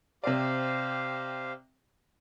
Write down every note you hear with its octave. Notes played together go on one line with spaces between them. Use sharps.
C3 G4 C5 D5 F5